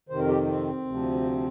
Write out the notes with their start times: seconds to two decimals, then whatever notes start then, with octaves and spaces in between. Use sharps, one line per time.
0.09 F2 C3 D#3 C5
0.19 A#4
0.29 G4
0.47 C4
0.85 D2 C3 F3